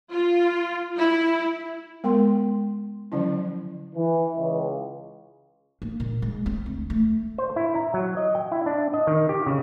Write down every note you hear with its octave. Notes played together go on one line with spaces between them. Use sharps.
F4
E4
G#3 B3 A#4 G5 C6
D3 F3 F#3 C#4 E4
E3
C#2
A#3
A#2
G#3
C4
D2
A3
C5
E4
A#5
F#3
D#5
G5
E4
D4
D#5
D#3
G4
C#3